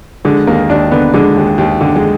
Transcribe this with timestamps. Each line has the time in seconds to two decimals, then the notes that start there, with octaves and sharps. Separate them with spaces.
0.25 D3 G#3
0.47 D#2 A#3
0.69 D#2 D4
0.91 D3 B3
1.14 D3 G#3
1.36 D#2
1.58 D#2
1.81 D3
1.96 G#3